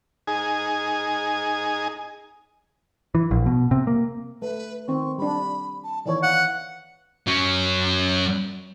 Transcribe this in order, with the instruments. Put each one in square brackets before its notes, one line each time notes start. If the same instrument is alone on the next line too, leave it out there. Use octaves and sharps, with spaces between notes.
[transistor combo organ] D#4 G#4 G#5
[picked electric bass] E3
A#1
B2
C3
A#3
[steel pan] A3 [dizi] B4
[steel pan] D#3 C4 [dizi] C#6
[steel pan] G3 D4 [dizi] B5
[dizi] A5
[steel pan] D#3 E3 C#5 [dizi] D5
[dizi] F5 [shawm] F#5
[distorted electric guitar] F#3 C#4